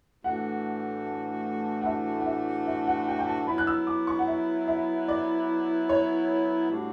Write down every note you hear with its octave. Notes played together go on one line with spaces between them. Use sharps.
A2 E3 A3 D4 F#4 F#5
F#5
E5
F#5
E5
E5
F#5
G5
G5
A5
F#3 B3 E4 B5
F#6
E6
D6
C#6
F#5
E5
E5
D5
C#5
A2 G3 D4 F#4